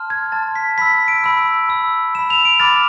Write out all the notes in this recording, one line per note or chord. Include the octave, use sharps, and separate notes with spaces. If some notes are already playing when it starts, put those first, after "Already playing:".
Already playing: A5 C6 F6
G#6
A5 C6 F6 A6
B6
B5 E6 B6
D7
B5 E6
B5 E6
B5 E6 E7
F7
D7
B5 D6 F6 A6